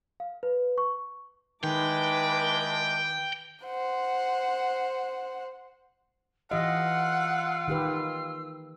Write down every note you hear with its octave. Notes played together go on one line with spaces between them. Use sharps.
F5
B4
C#6
D#3 G#3 E4 B4 G5 A5 D6
C5 F#5
E3 F4 G4 D#5 F#5 E6
D#3 G4 B4